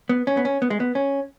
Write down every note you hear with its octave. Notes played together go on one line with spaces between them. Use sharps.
B3
C#4
B3
C#4
B3
G#3
B3
C#4